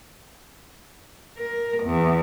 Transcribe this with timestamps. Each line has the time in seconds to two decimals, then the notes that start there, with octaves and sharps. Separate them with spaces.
1.37 A#4
1.83 E2